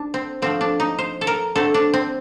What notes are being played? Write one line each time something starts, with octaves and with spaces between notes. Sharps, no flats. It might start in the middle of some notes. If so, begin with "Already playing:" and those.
Already playing: D4
C4
D3 F3 A3 C4
D4
D#4
C5
A4
A#4
D3 A3 C4 A4
D4
C4